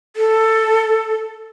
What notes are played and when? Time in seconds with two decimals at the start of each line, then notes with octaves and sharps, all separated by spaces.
0.16 A4